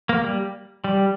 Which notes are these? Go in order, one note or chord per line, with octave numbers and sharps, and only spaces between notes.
A#3
G3
G3